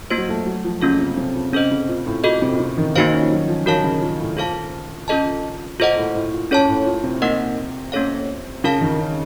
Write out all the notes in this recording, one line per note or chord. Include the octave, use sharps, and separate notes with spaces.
A#3 F4 C5
F#3
A3
F#3
F3
C#3 A#3 C#4 F4 A4
C3
C3
A#2
C3 C#4 A4 C5 D#5
C#3
A#2
A2
A#2 F#4 A4 D#5
C3
A#2
C3
D#3
D#3 A#3 D#4 F#4 C5 F5
C#4
F3
F#3
F3
D#3 F#4 A#4 C#5 F5 A5
C#3
A#2
A2
A#2 F4 A4 C5 F5 A5
C#4 F4 A4 D#5 A5
A#2 F4 A4 C5 D#5 F#5
A2
A2
A#2
A#2 C#4 A4 C#5 A5
A2
A#2
C3
A#3 D#4 A#4 D#5 F#5
A#3 C#4 A4 C#5 F5
C#3 F4 A#4 F5 A5
D#3
C#4